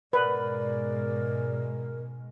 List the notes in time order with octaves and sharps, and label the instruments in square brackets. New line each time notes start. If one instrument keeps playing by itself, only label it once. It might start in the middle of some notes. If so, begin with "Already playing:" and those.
[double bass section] G#2 B2 G#3 [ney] A#4 [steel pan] B4 [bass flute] D5